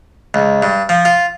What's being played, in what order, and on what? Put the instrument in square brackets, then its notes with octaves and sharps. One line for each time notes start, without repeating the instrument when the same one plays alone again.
[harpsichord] C#2
G2
F3
F4